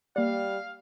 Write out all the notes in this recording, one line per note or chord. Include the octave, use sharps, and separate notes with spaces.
G3 A#3 D5 F5